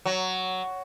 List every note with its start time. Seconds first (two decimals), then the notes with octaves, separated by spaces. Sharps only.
0.06 F#3